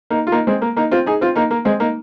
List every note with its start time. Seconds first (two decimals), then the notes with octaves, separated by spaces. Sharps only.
0.10 A#3 D#4
0.27 F4
0.32 A#3 D#4
0.47 G#3 C4
0.62 A#3
0.77 A#3 D#4
0.91 C4 F4
1.06 D#4 G#4
1.21 C4 F4
1.36 A#3 D#4
1.51 A#3
1.65 G#3 C4
1.80 A#3 D#4